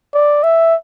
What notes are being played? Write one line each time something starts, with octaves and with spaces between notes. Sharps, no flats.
D5
E5